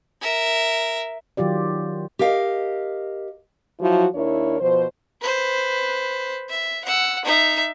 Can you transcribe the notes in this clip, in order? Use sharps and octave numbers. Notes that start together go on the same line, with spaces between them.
A#4 E5
D#3 F#3 F4 G4 D5
G4 A#4 D#5 F5
F3 F#3 E4 F#4
D#2 D4 E4 A#4 C#5
B2 F3 C5
B4 C5
E5
F#5 E6
D#4 E5